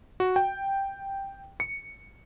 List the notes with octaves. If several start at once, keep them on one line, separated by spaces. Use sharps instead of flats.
F#4
G5
C#7